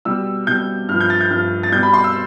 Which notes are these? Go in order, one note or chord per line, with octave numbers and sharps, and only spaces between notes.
B2 G3 E6
B2 G3 G6
G2 F3 F6
G6
A6
G6
G2 F3 F6
A6
B2 G3 G6
B5
C6
E6